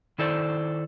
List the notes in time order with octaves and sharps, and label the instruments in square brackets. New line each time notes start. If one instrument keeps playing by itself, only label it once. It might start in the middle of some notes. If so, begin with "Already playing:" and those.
[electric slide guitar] D#3 E4 A4 C5 D5